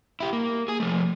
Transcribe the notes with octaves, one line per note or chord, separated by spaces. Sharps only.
E4 G4
A#3
G#4 G#5
F3 A3